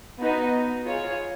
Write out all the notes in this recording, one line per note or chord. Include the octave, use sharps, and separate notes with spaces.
B3 D#4 F#4 B4 D#5
F4 G#4 C#5